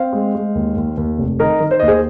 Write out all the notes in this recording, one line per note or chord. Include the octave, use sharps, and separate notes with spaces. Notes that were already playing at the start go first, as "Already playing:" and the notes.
Already playing: C4 C5 F5
G#3
G#3
D#2
D#2
D#2
F1
D#3 A#4 D#5
D#3
C5
D#2 D#5
G#4 C5